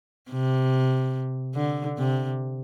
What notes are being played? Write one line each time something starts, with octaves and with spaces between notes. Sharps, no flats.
C3
D3
C3